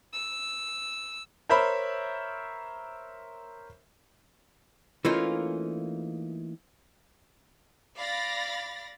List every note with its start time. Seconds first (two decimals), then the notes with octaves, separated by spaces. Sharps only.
0.13 E6
1.49 A#4 C5 C#5 E5 B5
5.05 E3 A3 A#3 C#4 D#4 F4
7.97 D5 F5 B5 A6 A#6